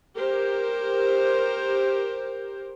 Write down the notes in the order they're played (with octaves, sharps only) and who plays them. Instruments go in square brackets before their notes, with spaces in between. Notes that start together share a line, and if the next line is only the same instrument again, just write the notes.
[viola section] G4 A#4 C5